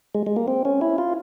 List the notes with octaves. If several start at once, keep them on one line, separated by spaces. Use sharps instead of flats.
G#3
G#3
A#3
C4
C#4
E4
F4